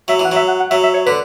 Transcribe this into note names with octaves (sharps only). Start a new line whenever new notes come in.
F#3 E5
E3
F#5
F#3 E5
F#5
F#5
F#3 E5
E5
C#5
D3 B4